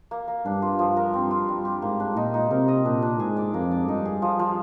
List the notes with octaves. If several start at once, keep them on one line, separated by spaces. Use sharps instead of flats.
A#3
A#3
G2 D4
F4
F3
A#4
G2 C4
F4
G3
G4
G#2 A#3
D4
A#2 D#4
D#4
C3 A#4
D#5
A#2 D4
D4
G#2 G#4
D5
F2 A#3
D5
G2 D#4
G#4
F3
F3